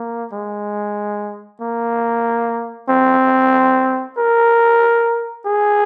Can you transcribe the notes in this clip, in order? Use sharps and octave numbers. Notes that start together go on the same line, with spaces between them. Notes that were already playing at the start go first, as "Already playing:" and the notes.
Already playing: A#3
G#3
A#3
C4
A#4
G#4